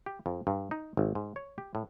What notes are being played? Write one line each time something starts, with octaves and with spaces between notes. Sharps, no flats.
G4
F2
G2
D#4
G#1
G#2
C#5
G4
A2